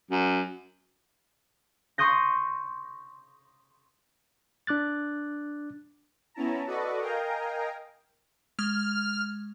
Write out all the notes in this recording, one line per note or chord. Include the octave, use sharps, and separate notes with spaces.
F#2
C6 C#6 D#6 G6 A#6
D4 D6 F#6 A6
B3 C#4 E4 A5 A#5
F#4 A4 B4 D5 D#5 C#6
A#4 D#5 F5 G5 G#5 A#5
G#3 F6